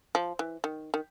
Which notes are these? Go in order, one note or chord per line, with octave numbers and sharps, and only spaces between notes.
F3
E3
D#3
D#3